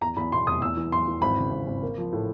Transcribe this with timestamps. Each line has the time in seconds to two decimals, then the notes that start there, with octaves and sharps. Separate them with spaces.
0.01 E2 A#5
0.16 E2 B5
0.32 B2 C6
0.47 F1 D#6
0.62 E2 E6
0.77 E3
0.92 E2 C6
1.08 E3
1.22 G#1 B5
1.38 C#3
1.52 G#1
1.67 G#1
1.83 A#3
1.98 F3
2.13 A2